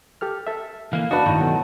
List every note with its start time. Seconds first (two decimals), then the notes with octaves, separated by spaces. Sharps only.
0.21 G4 A4 F6
0.47 A4 E5
0.93 E3 A#3 F5
1.11 D4 F#4 B4 D#5 F5 A5
1.26 A1 D#3
1.38 B2 F#3 A3